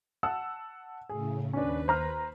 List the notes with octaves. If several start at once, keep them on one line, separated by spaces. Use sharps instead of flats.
F#5 A5 E6
A2 C#3 G#4
D#2 C#4 D4 B4
C5 A#5 F6